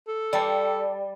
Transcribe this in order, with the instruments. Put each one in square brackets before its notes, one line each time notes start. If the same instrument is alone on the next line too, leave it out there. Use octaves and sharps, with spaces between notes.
[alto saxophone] A4
[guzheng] G3 [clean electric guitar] D5 G5 A5